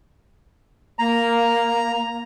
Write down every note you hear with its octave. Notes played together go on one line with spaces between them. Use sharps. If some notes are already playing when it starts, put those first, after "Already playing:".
A#3 A#5